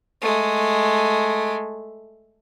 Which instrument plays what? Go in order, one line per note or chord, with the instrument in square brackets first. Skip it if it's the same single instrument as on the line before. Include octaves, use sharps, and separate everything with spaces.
[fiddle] G#3 A3